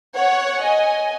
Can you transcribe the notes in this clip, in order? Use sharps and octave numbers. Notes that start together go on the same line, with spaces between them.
C#5 F#5
D#5 G#5